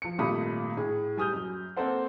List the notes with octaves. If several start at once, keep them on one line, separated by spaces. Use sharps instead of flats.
F3 C#7
G#1 A#2 G3 A3 B5 D#6
A2 G#4
G3 G#5 D#6 F6 G6
F#2
A#3 C4 A4 C5 F#5